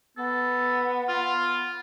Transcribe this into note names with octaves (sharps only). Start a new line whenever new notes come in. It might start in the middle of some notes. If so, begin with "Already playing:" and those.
B3 A4
F4